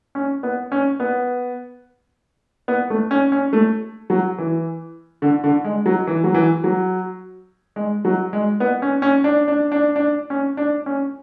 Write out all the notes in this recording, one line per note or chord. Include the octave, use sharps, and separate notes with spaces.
C#4
B3
C#4
B3
B3
A3
C#4
C#4
A3
F#3
E3
D3
D3
G#3
F#3
E3
F#3
E3
F#3
G#3
F#3
G#3
B3
C#4
C#4
D4
D4
D4
D4
C#4
D4
C#4